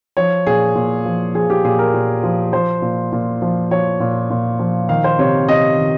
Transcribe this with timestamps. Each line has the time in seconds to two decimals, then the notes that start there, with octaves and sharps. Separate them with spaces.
0.17 F3 C#5
0.47 A#2 G#4
0.75 A#2
1.06 F3
1.35 F3 G#4
1.50 G4
1.64 A#2 G#4
1.79 A#4
1.94 A#2
2.23 F3
2.53 F3 C5
2.82 A#2
3.12 A#2
3.42 F3
3.71 F3 C#5
4.00 A#2
4.30 A#2
4.59 F3
4.89 D#3 F5
5.04 C5
5.19 C3 C#5
5.49 C3 D#5
5.78 D#3